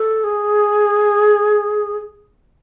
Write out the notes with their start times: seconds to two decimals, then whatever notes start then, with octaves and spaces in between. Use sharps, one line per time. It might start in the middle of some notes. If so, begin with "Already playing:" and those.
Already playing: A4
0.24 G#4